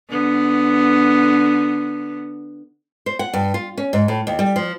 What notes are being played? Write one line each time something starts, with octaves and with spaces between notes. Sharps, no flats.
D3 B3
C5
F#5
G2
F4
C#4
G#2
A2
D#2
G3
F3